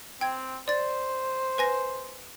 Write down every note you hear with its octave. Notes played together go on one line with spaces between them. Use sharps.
C4 G5 G#6
C5 D5 A6
B4 G#5 A#6